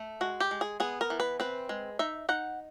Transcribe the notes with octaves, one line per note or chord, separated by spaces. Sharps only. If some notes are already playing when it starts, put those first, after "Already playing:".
Already playing: A3
G#3 F#4
G4
G#3
G#4
B3 G#4
A#4
E3
B4
C4 B4
G#3
D#4 E5
D#4 F#5